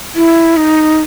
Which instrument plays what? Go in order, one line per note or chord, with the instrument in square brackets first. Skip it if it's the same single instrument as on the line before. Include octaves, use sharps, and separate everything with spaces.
[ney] E4
D#4